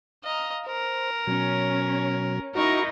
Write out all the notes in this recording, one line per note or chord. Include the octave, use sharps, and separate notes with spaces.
D#5 F5 A#5
A#4 C5
B2 F#3 C#4
D#4 E4 F#4 A#4 D#5 C#6